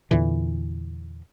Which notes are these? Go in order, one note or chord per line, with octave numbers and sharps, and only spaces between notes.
E2 A#2 D3 E3